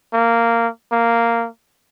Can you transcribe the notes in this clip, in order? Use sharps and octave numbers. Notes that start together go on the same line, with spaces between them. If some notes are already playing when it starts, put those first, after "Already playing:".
A#3
A#3